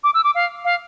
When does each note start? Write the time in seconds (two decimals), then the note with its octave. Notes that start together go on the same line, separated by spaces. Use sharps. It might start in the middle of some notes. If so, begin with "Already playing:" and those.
0.04 D6
0.14 E6
0.24 D6
0.35 F5
0.64 F5